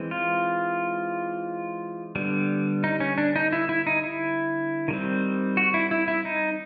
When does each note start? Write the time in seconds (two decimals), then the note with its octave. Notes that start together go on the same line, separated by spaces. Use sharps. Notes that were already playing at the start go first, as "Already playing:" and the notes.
Already playing: E3 G#3 C4
0.11 F4
2.16 D3 G3 B3
2.84 D#4
3.00 C#4
3.18 D4
3.36 D#4
3.52 E4
3.69 E4
3.87 D#4
4.04 E4
4.88 D#3 G3 C4
5.57 F#4
5.74 E4
5.91 E4
6.08 E4
6.25 D#4